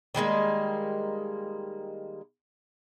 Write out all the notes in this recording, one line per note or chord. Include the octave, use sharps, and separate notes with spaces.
D#3 G3 G#3 A#3